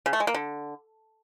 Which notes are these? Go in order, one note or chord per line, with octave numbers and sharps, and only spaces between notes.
C#3
A3
G#3
A#3
D3